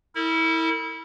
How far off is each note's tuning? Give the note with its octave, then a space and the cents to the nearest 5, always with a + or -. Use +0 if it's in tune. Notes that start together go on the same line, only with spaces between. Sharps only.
E4 -25 A#4 -40